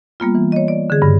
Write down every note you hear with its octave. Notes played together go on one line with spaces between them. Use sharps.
G3 A#3 B3 F4
E3
C#5 D#5
D5
D3 G#4
G2 C#3